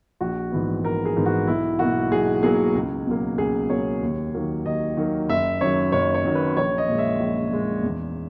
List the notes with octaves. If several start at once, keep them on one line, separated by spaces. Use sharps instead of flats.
A#1 F#4
G#2 E3 B3
A#1 A#4
G#4
G#2 E3 B3
F#4
B1 E4
B2 F#3 A#3 F#4
B1 G#4
B2 F#3 A#3 G#4
C#2
B2 F#3 A#3
C#2 G#4
B2 F#3 A#3 C#5
D#2
D#3 F#3 A#3
D#2 D#5
D#3 F#3 A#3
F#1 E5
F#2 D#3 F#3 C#5
F#1 C#5
C#5
F#2 D#3 F#3
B4
A#1 C#5
D#5
A#2 G#3
E5
A#1
A#2 G#3
E2